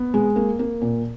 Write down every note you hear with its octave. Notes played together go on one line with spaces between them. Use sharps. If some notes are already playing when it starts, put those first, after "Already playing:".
Already playing: B3
G#3
A#3
A#3
A#2